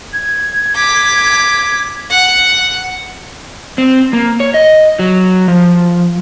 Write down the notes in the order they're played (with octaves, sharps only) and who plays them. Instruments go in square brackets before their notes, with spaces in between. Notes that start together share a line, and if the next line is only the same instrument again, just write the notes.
[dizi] G#6
[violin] D6 B6
F#5
[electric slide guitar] C4
A#3
C#5
D#5
F#3
F3